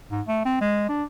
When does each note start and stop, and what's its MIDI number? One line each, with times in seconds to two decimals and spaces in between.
0.11 0.21 44
0.26 0.40 57
0.45 0.56 60
0.61 0.84 56
0.89 1.03 62